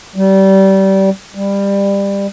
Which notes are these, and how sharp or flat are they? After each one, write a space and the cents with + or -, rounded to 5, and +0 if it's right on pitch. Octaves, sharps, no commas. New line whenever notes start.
G3 -25
G3 +20